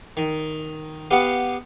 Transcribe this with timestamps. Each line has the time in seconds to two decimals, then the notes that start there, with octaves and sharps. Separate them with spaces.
0.17 D#3
1.11 B3 G4 F5 F#5